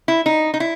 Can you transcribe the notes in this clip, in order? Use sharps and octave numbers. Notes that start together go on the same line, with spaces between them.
E4
D#4
D#4
E4